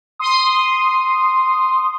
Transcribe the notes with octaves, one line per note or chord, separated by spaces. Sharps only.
C6 D#6